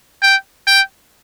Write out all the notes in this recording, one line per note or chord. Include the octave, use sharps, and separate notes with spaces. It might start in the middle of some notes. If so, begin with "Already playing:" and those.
G5
G5